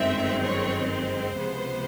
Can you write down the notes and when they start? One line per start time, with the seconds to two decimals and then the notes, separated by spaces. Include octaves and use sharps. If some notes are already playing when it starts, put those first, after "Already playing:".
Already playing: G1 F#2 D#3 G#3 C4 E5
0.44 C#5
0.90 C5
1.35 C#2 C3 F3 G#3 B3